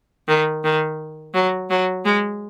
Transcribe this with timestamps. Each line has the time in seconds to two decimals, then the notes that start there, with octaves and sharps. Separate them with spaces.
0.28 D#3
0.64 D#3
1.34 F#3
1.70 F#3
2.05 G#3